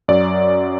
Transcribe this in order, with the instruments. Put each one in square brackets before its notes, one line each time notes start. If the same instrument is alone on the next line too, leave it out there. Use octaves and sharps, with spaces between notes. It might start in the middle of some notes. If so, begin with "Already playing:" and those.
[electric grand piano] F#2 F#3 D5